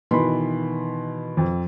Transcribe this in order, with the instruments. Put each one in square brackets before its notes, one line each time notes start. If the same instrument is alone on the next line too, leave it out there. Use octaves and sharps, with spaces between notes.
[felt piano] B2 D#3 E3 [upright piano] B5 C6
[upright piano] F2